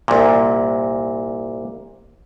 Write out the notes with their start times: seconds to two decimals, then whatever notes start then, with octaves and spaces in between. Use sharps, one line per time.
0.08 C2 A#2